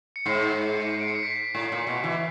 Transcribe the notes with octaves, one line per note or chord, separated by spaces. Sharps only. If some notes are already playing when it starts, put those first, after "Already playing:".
C#7
G#2 C7
C7
C7
D7
C#7
C7
B6
A2
A#2
B2
E3